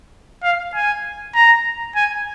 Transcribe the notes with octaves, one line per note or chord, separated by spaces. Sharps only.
F5
G#5
A#5
G#5